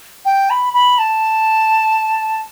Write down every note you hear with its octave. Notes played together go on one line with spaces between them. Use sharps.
G5
B5
B5
A5